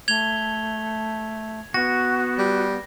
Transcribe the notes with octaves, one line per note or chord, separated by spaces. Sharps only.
A3 G#6 F7 G7
B3 F#4 A#6
G3